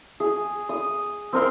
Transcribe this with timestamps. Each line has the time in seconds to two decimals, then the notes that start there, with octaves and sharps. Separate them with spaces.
0.20 G#4
0.69 D#6
1.33 C4 A#4 C6